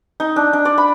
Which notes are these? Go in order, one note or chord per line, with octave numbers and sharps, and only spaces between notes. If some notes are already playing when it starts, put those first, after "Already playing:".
D#4
D4
D4
D5
B5